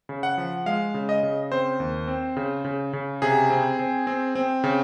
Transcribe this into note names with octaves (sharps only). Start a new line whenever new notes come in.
C#3
F#5
F3
G#3 F5
C#3
D#5
C#3
C4 C5
D#2
C4
C#3
C#3
C#3
C3 G#4
C4
C4
C4
C4
C#3